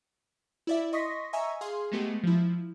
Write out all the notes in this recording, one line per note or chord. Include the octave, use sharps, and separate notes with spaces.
E4 D5 E5
D#5 C6 C#6 D#6 A#6 B6
D#5 E5 G#5 A#5 C#6 E6
G#4 F5 C6
G#3 A3 B3 G4
F3 E4